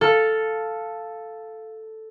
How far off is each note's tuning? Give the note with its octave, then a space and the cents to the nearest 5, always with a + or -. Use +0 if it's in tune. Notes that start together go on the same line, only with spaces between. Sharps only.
A4 +0 F5 +0